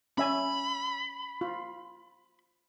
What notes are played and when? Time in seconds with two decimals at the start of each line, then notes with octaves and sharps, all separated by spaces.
0.18 C#4 E5 G#5 B5
1.41 F4